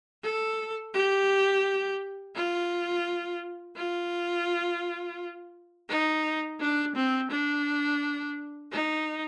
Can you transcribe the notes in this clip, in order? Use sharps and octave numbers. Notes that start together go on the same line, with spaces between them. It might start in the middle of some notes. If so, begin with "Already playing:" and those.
A4
G4
F4
F4
D#4
D4
C4
D4
D#4